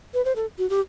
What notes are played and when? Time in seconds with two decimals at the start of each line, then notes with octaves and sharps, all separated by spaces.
0.14 B4
0.25 C5
0.36 A4
0.58 F#4
0.70 G4